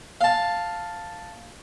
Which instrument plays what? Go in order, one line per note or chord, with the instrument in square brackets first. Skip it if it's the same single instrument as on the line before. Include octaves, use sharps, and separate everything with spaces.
[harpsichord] F5 A5